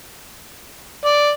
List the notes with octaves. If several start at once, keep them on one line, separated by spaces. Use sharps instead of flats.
D5